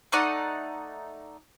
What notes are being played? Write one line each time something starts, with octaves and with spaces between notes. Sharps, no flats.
A3 D#4 D5 F#5